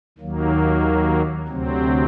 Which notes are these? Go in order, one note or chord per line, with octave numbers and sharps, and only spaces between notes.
D#2 D#3 F#3 A#3
D2 C3 F#3 C4